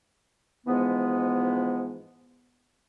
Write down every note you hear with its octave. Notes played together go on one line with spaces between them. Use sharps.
G#2 E3 F3 G#3 B3